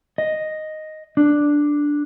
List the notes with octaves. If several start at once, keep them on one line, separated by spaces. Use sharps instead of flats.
D#5
D4